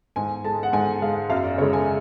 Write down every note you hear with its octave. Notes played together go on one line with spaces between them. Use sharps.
G#2 G#5
G#3 A5
F#5
G#2 G#5
G#3 F5
F#2 F5
D5
C#3 G#3 C#5
G#5